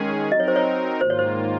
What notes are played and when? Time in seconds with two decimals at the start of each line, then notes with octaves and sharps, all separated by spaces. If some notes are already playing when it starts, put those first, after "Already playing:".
Already playing: D#3 G#3 C#4 G#4
0.32 F#3 C4 D#4 A#4 D#5
0.40 C#5
0.48 C5
0.56 C#5
1.01 G#2 D#3 A#3 F4 C5
1.10 C#5
1.19 C5